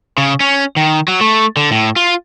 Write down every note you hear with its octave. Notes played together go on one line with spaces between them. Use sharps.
C#3
C#4
D#3
F#3
A3
D3
A2
F4